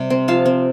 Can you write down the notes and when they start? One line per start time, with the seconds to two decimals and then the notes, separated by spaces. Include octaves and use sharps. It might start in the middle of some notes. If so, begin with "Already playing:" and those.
Already playing: C3 G3
0.10 C4
0.28 F3 F5 A5
0.46 C4